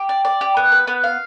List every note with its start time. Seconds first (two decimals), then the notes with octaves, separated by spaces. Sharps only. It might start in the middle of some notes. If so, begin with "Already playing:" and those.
Already playing: G4
0.09 D5
0.25 D5
0.41 G4
0.57 B3
0.72 B4
0.87 B3
1.04 F5